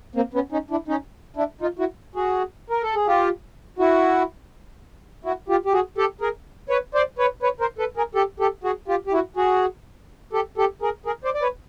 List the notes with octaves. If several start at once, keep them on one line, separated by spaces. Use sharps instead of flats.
A#3 C4
B3 C#4
C#4 D#4
D4 E4
C#4 D#4
D4 E4
D#4 F4
E4 F#4
F#4 G#4
A#4
A4
G#4
F4 G4
E4 F#4
E4 F#4
F4 G4
G4
F#4 G#4
G4 A4
G#4 A#4
B4 C#5
C5 D5
B4 C#5
B4 C#5
A#4 C5
A4 B4
G#4 A#4
G4 A4
G4 A4
F#4 G#4
F4 G4
G4
E4 F#4
F#4 G#4
G4 A4
G4 A4
G#4 A#4
G#4 A#4
C5 D5
D5
B4 C#5